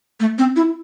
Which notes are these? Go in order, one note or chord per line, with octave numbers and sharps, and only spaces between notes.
A3
C4
E4